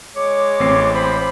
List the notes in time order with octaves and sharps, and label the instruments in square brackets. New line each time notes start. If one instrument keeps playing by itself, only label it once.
[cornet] G#3 [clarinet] C#5 [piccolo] D6
[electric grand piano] A1 C4 C7
[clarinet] C5 [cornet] B5